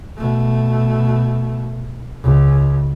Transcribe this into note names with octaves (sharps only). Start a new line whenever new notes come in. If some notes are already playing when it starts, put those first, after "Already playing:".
B2 A3
C#2